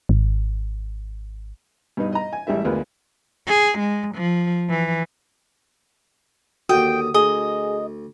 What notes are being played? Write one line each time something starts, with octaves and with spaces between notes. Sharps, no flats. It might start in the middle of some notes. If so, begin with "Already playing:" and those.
G#1
G2 B2 B3 D#4
D#5 A#5
G#5
A1 G3 G#3 E5
D2 G#3 B3 F4 A#4 B4
G#4
G#3
F3
E3
D#2 D3 F#4 G5 D#6
D2 G#4 D#5